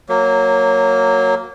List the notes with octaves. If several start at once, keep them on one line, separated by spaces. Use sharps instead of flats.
F#3 A#3